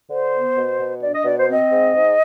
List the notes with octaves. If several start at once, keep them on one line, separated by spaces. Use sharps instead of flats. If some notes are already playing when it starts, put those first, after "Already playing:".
D3 C5
B3
B2
B2
D4 D5
D#5
B2 D5
C5
C4 D#5
G#2
G#2